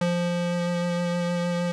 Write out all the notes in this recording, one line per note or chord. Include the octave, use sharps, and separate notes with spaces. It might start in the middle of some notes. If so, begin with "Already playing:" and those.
F3